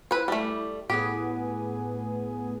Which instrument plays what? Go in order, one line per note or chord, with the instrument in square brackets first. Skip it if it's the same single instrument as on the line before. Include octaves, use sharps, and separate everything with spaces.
[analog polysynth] E4 [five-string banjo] B4 C5
[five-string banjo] G3 A3
[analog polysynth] A2 B3 G#4 [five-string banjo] G4